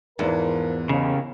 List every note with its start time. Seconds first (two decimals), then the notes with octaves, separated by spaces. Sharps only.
0.19 E2 G#2 E3 F3 A#4
0.89 D#2 C#3